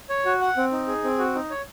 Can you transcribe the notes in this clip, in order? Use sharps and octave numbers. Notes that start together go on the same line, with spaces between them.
C#5
F#4
F#5
C4
D#4
G#4
C4
F#4
D#4
C#5